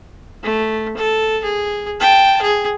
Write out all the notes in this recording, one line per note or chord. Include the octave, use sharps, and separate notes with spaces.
A3
A4
G#4
G5 A5
G#4